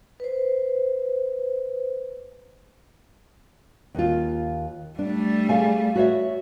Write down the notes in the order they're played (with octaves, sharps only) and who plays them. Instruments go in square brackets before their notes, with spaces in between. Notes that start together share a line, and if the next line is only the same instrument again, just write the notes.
[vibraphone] B4 C5
[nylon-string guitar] D#2 F4
[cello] G3 A3 [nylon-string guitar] D4
[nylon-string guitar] G#4 F5 G#5
F#4 C#5 E5